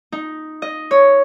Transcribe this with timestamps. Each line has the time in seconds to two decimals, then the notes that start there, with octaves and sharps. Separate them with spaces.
0.12 D#4
0.62 D#5
0.91 C#5